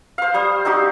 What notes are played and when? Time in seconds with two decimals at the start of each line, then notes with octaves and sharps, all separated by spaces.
0.18 C5 F5
0.34 G3 C5 D#6
0.65 C4 D#4 F#4 G4